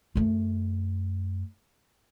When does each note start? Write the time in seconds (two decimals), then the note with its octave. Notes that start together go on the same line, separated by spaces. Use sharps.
0.15 F#2 A3